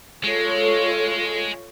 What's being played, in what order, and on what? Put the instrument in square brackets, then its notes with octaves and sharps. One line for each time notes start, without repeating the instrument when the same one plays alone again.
[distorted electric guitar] G#3 [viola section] F4 A4 C#5